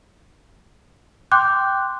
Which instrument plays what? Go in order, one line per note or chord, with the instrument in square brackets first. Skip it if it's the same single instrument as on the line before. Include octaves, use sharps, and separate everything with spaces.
[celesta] G5 C6 D6 F#6 G6